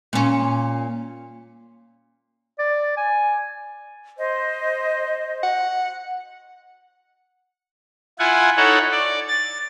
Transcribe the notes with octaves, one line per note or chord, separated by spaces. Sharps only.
A#2 C#4
D5
G#5
C5 D#5
F#5
E4 F4 F#5 G#5
D#4 E4 A4 C#5 F#5
D5
A6